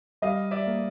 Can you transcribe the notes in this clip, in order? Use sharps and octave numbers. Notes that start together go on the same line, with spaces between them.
G3 D#5 F5
D5 E5
A#3